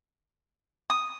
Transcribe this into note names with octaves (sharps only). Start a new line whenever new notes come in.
D#6